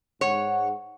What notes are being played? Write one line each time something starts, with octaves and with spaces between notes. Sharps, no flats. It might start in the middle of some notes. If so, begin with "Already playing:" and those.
G#2 C#5 F#5